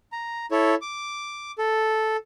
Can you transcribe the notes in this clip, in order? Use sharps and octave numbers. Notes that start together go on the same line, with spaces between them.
A#5
E4 A4 C#5
D6
A4